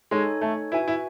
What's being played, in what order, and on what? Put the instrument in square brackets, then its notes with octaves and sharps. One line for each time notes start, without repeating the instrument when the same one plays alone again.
[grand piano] G#3 [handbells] D#4 A4 C#5 G#5
[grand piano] A3
[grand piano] E4 [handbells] F#4 B4 E5 G#5
[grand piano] E4